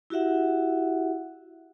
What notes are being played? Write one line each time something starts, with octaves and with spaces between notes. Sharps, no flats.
E4 F#4 G4 E5 F#5